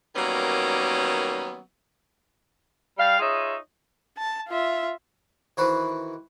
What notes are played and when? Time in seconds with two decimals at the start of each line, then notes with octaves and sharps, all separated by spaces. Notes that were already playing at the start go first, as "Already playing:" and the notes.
0.16 D#3 F#3 G3 A#3 B3 C#4
2.98 G3 F5
3.19 D#4 F4 G#4 C#5 E5
4.18 A5
4.49 F4 E5
5.57 D#3 E3 F#4 B4 C5